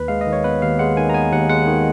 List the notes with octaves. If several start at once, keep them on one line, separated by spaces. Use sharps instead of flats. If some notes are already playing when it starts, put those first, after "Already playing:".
Already playing: D#2 B4
G#3 F5
D#5
D#3
C#5
B3 B4
D#2 F5
G#3 F#5
D#3 G#5
A#5
B3 G#5
D#2 F#5
G#3 F#5
D#3